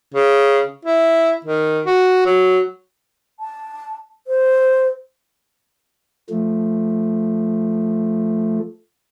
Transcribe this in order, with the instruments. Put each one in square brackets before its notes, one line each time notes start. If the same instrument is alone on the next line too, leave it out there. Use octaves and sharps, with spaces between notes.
[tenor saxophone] C#3
E4
D#3
F#4
F#3
[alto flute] A5
C5
[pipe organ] F3 A3